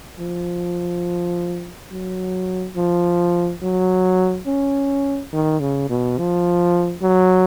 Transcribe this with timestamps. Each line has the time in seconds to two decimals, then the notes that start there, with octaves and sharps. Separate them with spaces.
0.20 F3
1.92 F#3
2.76 F3
3.62 F#3
4.46 C#4
5.33 D#3
5.60 C#3
5.89 B2
6.18 F3
7.03 F#3